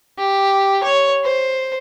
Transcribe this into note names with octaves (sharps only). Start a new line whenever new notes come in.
G4
C#5
C5